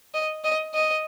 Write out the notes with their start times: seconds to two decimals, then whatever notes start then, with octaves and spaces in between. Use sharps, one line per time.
0.14 D#5
0.44 D#5
0.74 D#5